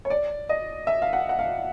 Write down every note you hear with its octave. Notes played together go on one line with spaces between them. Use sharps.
C#5
D5
D#5
E5
F5
F#5
F#5
F5